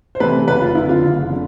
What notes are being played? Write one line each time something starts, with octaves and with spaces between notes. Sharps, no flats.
C5
C3 E3 A3 B4
F#1 B4
F4
F2 D3 E4
F4
F#1
D3